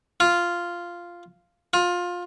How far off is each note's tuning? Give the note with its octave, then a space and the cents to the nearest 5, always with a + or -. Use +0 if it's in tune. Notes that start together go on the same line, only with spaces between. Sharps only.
F4 -5
F4 +20